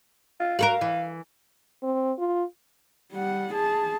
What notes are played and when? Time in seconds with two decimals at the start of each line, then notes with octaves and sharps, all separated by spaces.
0.40 F4
0.59 F#4 A4 A#4 F5
0.81 E3
1.83 C4
2.18 F4
3.12 G3 F#5
3.53 G#4 A5